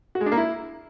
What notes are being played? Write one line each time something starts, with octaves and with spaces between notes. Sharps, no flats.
F#4
G#3
D4
A#3
E4